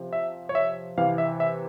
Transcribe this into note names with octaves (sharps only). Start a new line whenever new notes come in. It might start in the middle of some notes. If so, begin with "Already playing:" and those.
Already playing: C3 F3
E5
C#5
E5
C3 E3 F5
E5
E5